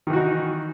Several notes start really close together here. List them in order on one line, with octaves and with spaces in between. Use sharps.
D#3 E3 F#4 D#4